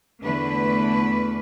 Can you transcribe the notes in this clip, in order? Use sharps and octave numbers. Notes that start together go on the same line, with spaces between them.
E2 D3 A3 B4